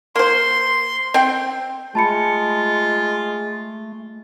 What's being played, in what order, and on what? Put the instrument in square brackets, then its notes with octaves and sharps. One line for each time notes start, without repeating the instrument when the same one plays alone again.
[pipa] A#3 C5 [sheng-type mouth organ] C6
[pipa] C4 G5
[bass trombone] G#3 [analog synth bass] A3 [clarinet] F4 [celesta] A5 B5 C#7